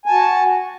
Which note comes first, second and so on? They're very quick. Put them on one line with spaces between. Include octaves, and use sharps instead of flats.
G#5 A5 F#4